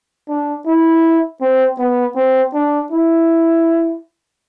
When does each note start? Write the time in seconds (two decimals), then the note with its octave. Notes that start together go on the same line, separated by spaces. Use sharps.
0.28 D4
0.66 E4
1.41 C4
1.79 B3
2.16 C4
2.54 D4
2.92 E4